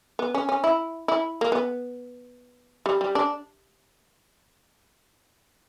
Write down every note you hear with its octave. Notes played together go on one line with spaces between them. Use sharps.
B3
C#4
C#4
E4
E4
A#3
B3
G3
G3
D4